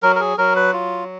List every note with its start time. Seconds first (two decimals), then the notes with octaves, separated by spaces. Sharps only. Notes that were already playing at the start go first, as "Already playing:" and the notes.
0.03 F#3 A#4
0.16 A#4
0.20 G#4
0.38 F#3 A#4
0.56 B4
0.73 F4